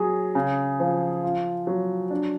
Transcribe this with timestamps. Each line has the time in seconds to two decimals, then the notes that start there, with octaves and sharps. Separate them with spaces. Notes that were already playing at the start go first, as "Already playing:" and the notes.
Already playing: F#3 G#4
0.35 C#3
0.80 F3
1.23 F4
1.67 F#3
2.10 D4